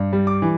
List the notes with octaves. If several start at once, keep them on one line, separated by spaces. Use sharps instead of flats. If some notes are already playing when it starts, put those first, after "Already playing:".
Already playing: G2
G3
D6
E3